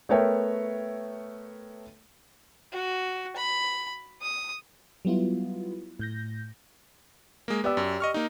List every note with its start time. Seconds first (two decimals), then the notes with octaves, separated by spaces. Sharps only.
0.09 A3 B3 A#4 C#5 E5 G5
2.72 F#4
3.36 B5
4.21 D#6
5.05 F#3 G3 B3 E4 F4
5.99 A2 G6 A#6
7.48 G#3 A#3
7.64 B3 G4 D5 E6
7.77 F#2
8.00 D#5 C#6 F6
8.14 A#3 D#4